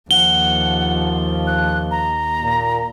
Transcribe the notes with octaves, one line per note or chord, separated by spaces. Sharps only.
D#2 F3 F#5 G7
F#6
A#5
A#2